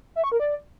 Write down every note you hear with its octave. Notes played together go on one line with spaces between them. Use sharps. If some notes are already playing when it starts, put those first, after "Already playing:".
E5
C#6
A#4
D5